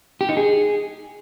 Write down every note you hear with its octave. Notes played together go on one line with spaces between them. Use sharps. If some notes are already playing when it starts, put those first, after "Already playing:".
G4
D#4
G#4